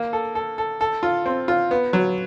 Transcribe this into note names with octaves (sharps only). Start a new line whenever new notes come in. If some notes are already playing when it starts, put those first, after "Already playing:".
Already playing: A#3
A4
A4
A4
A4
F4
C4
F4
B3
F#3